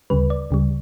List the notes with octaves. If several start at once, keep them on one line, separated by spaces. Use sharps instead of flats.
D2 C#3 G3 B4
D5
D2 C#3 G3